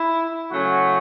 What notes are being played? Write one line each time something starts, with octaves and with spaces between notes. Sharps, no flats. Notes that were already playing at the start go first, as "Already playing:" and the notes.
Already playing: E4
C#3 F#3 A3 C#4 F#4